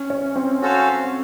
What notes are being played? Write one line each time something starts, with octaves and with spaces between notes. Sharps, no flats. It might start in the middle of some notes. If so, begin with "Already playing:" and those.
Already playing: C#4
C#4
C4
C#4 F#4 A4 C5 F5